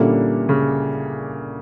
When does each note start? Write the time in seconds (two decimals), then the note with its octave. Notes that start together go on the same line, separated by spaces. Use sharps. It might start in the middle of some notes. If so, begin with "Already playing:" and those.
Already playing: A#2 D3 G3 A#3 C#4 E4
0.49 C#3